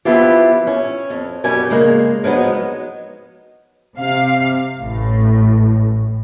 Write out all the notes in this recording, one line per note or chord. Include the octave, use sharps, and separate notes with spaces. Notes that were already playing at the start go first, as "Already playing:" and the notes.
E3 F3 B3 E4 F4 G4
C#4
F2
F#2 B2 G3 G4 G#5
C#3 G#3 A#3
F3 F#3 G#3 B3 D#4
C3 F5
A1 A2